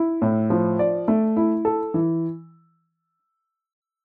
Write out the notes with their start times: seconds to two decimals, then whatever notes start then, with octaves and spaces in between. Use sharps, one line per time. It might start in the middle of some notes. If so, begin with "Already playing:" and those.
Already playing: E4
0.22 A2
0.50 F3
0.79 D5
1.08 A3
1.37 E4
1.65 A4
1.94 E3